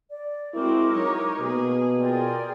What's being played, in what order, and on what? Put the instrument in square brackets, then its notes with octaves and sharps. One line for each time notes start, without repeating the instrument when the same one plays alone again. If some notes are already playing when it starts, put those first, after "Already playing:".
[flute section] D5
[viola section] G#3 C4 F#4 [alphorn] E4 [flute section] A#4 D6
[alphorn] F#3 [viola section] D#4 C#5
[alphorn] B2 [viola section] A#3 G#4
[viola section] F4 G#4 [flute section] A#4 D5 G5